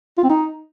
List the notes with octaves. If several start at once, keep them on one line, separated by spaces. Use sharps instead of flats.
F4
C4
D#4